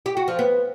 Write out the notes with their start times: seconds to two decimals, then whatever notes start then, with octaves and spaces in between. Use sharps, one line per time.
0.06 G4
0.17 F#4
0.28 F3
0.39 B3